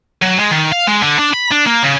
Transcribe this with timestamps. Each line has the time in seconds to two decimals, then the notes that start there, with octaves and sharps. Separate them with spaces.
0.22 F#3
0.38 G#3
0.51 D#3
0.72 F5
0.87 G#3
1.02 D3
1.19 D4
1.34 B5
1.52 D4
1.67 A#3
1.83 C#3